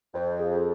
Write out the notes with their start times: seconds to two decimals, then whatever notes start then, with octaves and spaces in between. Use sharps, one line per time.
0.15 F2 C5
0.40 G#4